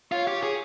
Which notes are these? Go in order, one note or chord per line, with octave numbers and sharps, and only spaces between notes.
F4 C#5
G4
G#4